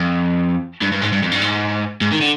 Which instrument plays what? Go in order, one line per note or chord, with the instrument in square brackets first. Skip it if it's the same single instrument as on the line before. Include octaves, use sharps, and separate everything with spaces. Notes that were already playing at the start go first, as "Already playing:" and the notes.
Already playing: [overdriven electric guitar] F2
G2
G2
G#2
G2
F2
G2
G#2
G#2
D#3
D3